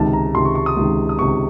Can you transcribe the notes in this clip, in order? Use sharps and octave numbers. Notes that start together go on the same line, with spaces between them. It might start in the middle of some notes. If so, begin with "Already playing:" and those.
Already playing: C#2 C3 D#3 A5
A#5
C#2 C3 D#3 C6
C#6
C#6
D#6
C#2 C3 D#3
D#6
C#2 C3 D#3 C#6